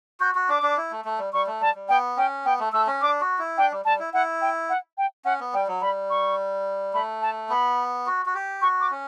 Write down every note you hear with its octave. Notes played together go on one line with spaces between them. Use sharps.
F#4 G6
F#4
D4 D6
D4
E4
A3
A3
G3
G3 C#6
A3
G3 A5
G3
B3 G5
C#4 G5
B3 G5
A3
A3 E6
C#4
D4 D6
F#4
E4
D4 G5
G3
G3 A5
E4
E4 F#5
G5
F#5
G5
C#4 F#5
B3
G3 G5
F#3
G3 B5
C#6
A3 B5
A5
B3 B5
F#4
F#4
G4
F#4 C#6
D6
C#4